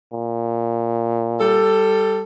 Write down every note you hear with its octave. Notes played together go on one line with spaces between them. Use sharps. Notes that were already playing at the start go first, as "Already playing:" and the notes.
A#2
G3 A4